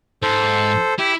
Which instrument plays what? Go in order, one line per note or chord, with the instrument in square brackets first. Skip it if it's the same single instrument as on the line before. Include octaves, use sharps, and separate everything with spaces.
[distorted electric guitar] G#2 [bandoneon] A4 C5
[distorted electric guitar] E4 [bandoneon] G4